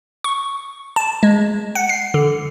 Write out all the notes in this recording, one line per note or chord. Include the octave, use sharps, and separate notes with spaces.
C#6
A5
G#3
F#5
C7
D3